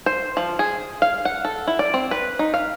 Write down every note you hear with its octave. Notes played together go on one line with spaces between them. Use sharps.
C5
F3
G#4
F5
F#5
A4
E4
D5
C4
B4
D#4
F5